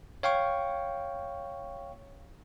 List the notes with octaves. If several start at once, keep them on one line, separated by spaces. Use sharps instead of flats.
C#5 F5 G5 C#6